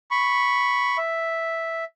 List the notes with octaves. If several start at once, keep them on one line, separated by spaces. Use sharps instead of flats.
B5 C#6
E5